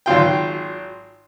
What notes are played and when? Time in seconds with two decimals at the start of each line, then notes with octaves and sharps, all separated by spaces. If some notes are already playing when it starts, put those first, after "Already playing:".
0.06 G#1 F#3 F4 G5